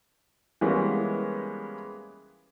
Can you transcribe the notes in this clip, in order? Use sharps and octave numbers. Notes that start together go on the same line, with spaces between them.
E3 G3 G#3 A#3 B3 C#4